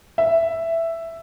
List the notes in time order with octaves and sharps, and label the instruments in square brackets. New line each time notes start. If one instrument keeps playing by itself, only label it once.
[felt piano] E5